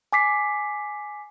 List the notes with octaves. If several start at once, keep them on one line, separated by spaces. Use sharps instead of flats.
G#5 D6 B6 C7